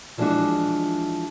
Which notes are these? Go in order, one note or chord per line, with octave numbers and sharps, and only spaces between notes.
E3 F3 G#3 D4 E4 F#4